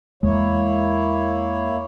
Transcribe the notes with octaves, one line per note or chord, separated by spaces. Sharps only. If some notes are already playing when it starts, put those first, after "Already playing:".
E2 G#3 A#3 E4 C#5